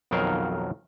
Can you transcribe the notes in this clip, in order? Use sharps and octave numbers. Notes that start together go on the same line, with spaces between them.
B1 F2 D#3 F#3 A#4 F5